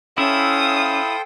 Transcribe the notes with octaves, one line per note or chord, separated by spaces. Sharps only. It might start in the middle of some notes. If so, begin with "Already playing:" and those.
C#4 E4 A4 C5 E5 F5 G5 D#6